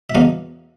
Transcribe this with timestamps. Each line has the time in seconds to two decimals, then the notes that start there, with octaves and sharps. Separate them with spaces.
0.10 E5
0.15 E2 C#3 F#3 A#3 D#4 F5